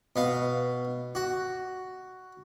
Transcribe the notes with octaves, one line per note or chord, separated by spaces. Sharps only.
B2 F5
F#4